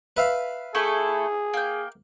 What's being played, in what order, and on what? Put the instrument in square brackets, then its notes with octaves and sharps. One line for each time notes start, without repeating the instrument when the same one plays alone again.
[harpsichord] B4 E5 F5
[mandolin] A3 E4 A4 [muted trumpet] G#4
[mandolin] A#3 G5